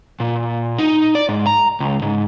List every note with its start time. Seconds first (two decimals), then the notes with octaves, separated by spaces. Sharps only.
0.20 A#2
0.78 D#4
1.15 D5
1.29 G#2
1.47 A#5
1.80 C#2
2.02 G#2